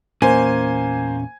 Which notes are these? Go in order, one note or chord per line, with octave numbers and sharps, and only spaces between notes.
E2 A#2 A#3 C#4 C5 G#5